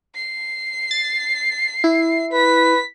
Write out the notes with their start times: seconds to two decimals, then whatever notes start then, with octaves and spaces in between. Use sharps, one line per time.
0.16 C7
0.91 A6
1.84 E4
2.32 B4 B6